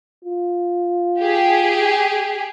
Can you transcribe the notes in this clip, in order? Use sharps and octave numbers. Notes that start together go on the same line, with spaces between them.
F4
G4 G#4